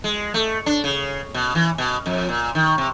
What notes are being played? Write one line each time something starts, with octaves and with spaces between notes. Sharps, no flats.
G#3
A3
D4
C#3
B2
E3
B2
F2
A#2
D#3
C3